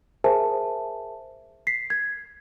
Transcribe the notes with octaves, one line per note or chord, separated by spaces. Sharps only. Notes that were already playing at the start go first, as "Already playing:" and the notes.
G#4 A#4 C5 E5 G#5 A5
B6 C7
G#6